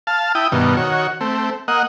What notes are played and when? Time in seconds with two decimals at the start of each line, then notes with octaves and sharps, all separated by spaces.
0.07 F5 A5
0.35 E4 G5 D#6
0.52 G2 B2 D#3
0.77 D#3 F#4 C#5
1.21 A3 C4
1.68 A#3 D#5 F#5